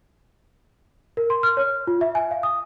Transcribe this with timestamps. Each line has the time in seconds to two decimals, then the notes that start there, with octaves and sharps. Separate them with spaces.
1.17 A#4
1.30 C6
1.43 F6
1.57 C#5
1.87 F4
2.01 E5
2.15 G#5
2.31 F5
2.43 D#6